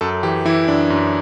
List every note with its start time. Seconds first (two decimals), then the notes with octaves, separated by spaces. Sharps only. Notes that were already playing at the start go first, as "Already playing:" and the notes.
0.01 F#2 A4
0.23 E3 G4
0.45 E3 E4
0.68 F#2 D4
0.90 F#2